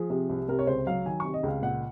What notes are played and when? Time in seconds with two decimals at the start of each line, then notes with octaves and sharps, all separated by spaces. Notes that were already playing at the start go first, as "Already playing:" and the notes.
Already playing: F3 G#4
0.10 C3
0.29 C2
0.48 C3 A#4
0.59 C#5
0.67 C#2 C5
0.86 F#3 F5
1.06 D#3 G#5
1.20 C#6
1.25 C3
1.34 D#5
1.43 C#2 F5
1.62 A#2 F#5